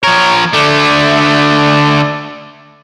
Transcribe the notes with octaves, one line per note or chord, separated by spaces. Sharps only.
F3 A#4 C#5
D3 A3 D5